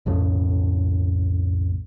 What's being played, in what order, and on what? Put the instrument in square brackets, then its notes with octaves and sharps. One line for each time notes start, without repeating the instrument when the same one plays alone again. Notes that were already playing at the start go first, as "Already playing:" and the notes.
[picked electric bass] B1 F2 A2 C#3